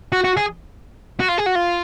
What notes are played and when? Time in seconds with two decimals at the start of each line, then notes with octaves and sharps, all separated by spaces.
0.12 F#4
0.24 F#4
0.37 G#4
1.20 F#4
1.28 F4
1.38 G#4
1.46 F#4
1.55 F4